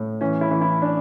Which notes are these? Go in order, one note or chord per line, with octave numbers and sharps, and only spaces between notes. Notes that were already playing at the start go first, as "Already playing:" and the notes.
Already playing: A2
E3 C#4
E4
E3
E4
D4